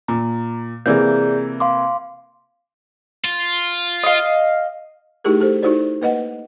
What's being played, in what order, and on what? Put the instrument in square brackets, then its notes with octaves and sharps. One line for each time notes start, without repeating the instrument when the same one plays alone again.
[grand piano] A#2 [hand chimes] A#5
[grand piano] C3 E3 A#3 [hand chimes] G#4 D5 G6
[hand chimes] F5 C6 D6
[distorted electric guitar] F4
[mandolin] D#5 F5
[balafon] A3 D#4 E4 G4 G#4 A#4
G4 A4 C5
D#4 E4 F#4 A4 C5 D5
A#3 B4 D#5 F#5